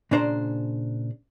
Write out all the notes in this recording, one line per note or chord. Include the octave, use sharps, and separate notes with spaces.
A#2 C#3 D4 C5 A#5